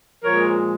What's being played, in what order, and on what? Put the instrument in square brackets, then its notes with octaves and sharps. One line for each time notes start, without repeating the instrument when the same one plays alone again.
[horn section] A#2 F3 G#3 A#4 C#5